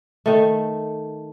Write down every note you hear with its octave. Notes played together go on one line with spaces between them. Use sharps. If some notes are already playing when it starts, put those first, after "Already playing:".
D#3 A3